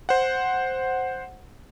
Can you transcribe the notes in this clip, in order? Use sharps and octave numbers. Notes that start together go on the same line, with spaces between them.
C5 F#5